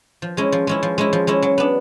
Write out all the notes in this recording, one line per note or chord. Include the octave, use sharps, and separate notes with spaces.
F3
G#3 C#4 E4
F3
G#3 C#4 E4
F3
G#3 C#4 E4
F3
G#3 C#4 E4
F#3
B3 D4